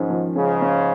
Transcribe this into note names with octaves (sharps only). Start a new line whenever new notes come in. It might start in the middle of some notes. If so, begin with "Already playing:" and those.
Already playing: G#2 D#3 F3 C#4
F3
G#2 C#3 C#4
C#4